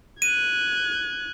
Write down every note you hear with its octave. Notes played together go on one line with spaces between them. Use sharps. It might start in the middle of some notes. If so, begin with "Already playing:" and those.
F#6 G#6 D#7